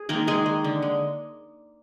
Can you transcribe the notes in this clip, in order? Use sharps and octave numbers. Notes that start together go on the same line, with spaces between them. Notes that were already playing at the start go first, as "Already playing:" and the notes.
Already playing: G#4
D#3 G#3 A#3 A#4
D#3 G#3 G#4
G#3
D3
G#3